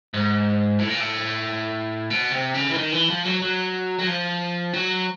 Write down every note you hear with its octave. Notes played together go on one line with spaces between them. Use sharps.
G#2
A2
A#2
A2
B2
C3
C#3
E3
D#3
E3
F3
F#3
F#3
F#3
F3
F#3